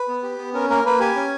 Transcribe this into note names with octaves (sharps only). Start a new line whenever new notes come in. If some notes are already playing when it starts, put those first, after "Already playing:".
Already playing: B4
B3
G4
B3
C#4 A#4
A#3 A#4
A#3 B4
G4 G#5
C#4